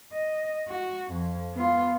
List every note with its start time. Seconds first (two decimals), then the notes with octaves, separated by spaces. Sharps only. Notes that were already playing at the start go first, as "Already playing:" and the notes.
0.12 D#5
0.68 F#4
1.12 F2
1.54 B3 F4